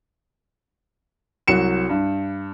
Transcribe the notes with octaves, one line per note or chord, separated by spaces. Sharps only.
C2 F#3 C#7 E7
G2